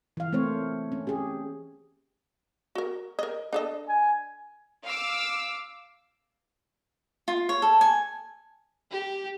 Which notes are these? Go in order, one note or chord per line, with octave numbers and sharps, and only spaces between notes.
E3 F5
A3 A#3 C4 C5 C#5
C#4
G4 G#4
F#4 A#4
A#4 D#5
D4 A4 D#5
G#5
F5 D6 E6
F4
C#5
A4
G#5
G4